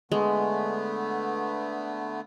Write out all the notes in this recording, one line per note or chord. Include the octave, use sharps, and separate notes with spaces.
D3 G#3 A3 B3